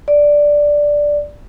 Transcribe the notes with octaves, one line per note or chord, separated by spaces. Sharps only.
D5